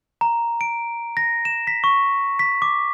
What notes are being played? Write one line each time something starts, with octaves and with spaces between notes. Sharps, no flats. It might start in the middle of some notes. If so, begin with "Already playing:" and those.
A#5
D7
A#6
E7
B6
C#6
B6
D6